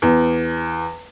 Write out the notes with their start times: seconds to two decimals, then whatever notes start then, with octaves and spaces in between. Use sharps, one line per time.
0.02 E2